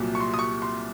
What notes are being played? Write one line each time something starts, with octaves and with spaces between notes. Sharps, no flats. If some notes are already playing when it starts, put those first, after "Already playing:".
Already playing: C2 A#2 F#3
C#6
C6
D#6
C#6
C6